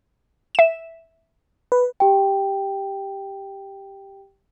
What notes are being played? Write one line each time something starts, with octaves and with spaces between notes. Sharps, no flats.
E5 E7
B4
G4 G5